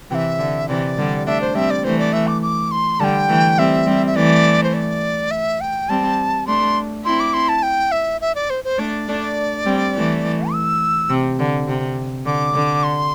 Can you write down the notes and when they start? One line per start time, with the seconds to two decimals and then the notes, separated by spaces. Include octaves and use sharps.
0.10 C3 E3 E5 G5
0.39 D3
0.68 C3 E3 D5
0.98 D3 G3
1.26 A3 D4 E5
1.41 C5
1.55 G3 C4 E5
1.70 D5
1.84 E3 A3 C5
1.99 D5
2.13 E5
2.27 D6
2.42 D6
2.71 C6
3.00 D3 G3 A5
3.04 G5
3.29 E3 A3
3.58 G3 C4 E5
3.86 G3 C4
4.07 E5
4.15 E3 A3 D5
4.64 C5
4.74 D5
5.31 E5
5.61 G5
5.89 G3 C4 A5
6.47 A3 D4 C6
7.05 C4 E4 C6
7.20 D6
7.33 C6
7.49 A5
7.63 G5
7.92 E5
8.21 E5
8.35 D5
8.50 C5
8.64 C5
8.78 A3 D4 D5
9.08 A3 D4
9.66 G3 C4
9.95 E3 A3
10.52 E6
11.10 C3
11.39 D3
11.68 C3
12.25 D3 D6
12.54 D3
12.83 C6